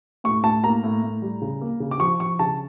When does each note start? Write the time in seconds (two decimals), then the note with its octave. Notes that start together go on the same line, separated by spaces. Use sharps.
0.24 A2 C#6
0.43 A2 A5
0.64 A#3 A#5
0.84 A2
1.03 A2
1.22 G3
1.41 C#3
1.61 A#3
1.80 C#3
1.91 D6
2.00 F3 C#6
2.20 F3 C#6
2.39 C#3 A5